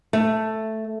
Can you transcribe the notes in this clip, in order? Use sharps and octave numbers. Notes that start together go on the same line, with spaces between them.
A3